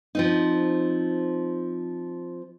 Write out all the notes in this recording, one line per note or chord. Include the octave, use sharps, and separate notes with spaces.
F3 C4 D#4